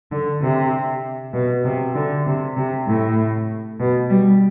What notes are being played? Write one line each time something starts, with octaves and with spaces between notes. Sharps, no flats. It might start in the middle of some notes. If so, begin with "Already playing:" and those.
D3
C3
B2
C3
D3
C3
C3
A2
B2
G3